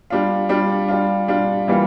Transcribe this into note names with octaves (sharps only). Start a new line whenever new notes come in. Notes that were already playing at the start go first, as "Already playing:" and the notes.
G3 D4 F4
G3 D4 F4
G3 D4 F4
G3 D4 F4
E3 G3 A#3 F4